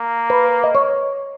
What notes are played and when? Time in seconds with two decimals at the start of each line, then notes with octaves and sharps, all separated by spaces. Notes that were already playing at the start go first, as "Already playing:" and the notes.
Already playing: A#3
0.30 B4
0.64 D#5
0.75 C#5